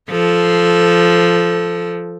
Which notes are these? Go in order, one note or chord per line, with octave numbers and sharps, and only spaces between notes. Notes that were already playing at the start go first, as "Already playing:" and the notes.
F3 A4